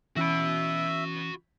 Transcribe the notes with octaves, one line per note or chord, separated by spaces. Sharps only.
E3 C#4 F#4 E5 B5